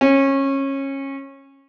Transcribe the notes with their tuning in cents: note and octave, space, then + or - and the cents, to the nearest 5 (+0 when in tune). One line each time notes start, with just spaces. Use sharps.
C#4 -25